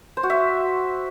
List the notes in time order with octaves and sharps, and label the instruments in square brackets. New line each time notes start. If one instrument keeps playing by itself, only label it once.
[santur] C5
F#4
E5